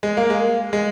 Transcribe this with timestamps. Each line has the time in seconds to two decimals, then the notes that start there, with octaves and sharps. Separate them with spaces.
0.03 G#3
0.17 A#3
0.30 G#3
0.73 G#3